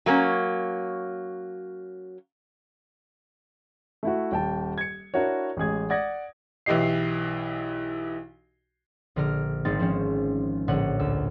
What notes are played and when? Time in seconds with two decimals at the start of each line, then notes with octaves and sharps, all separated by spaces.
0.06 F#3 A#3 C4 C#4
4.03 A3 E4 F#4
4.32 D#1 G5 A5
4.78 G#6 C#7
5.14 D4 E4 F#4 A#4 C#5
5.57 A1 G#3 G#4 G#6
5.90 D5 F#5 D#6 G#6 A#6
6.66 B1 E3 E4 G4 D#5 C7
9.16 A#1 D3 A#5 F6 D7
9.65 G#1 B3 C4 D#4 A6
9.79 F3 G#3 C4 C#4
10.68 A#1 A2 D3 C#5 F#5 F#6
10.99 D2 E6